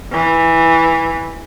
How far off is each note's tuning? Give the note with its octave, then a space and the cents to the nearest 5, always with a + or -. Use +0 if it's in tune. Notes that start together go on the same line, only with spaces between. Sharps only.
E3 -5